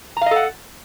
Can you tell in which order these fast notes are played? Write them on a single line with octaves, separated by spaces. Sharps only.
A#5 F5 D#5 A4 F#5